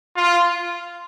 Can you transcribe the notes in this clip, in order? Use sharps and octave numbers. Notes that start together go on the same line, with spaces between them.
F4